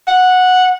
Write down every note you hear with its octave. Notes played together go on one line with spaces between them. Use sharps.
F#5